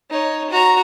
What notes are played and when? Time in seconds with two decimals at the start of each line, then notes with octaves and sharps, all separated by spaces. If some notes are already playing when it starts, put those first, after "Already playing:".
0.10 D#4 C#5
0.50 F#4 A#5